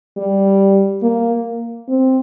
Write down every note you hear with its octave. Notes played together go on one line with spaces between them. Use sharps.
G3
A#3
C4